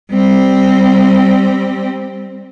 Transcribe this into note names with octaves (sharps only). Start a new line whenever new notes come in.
G3 C4